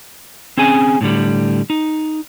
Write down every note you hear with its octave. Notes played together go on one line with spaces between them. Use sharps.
C4 C#4 G#4 G#5
A2 D3 G3
D#4